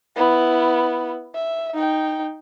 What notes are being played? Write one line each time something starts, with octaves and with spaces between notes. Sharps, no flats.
B3 E4
E5
D#4 G5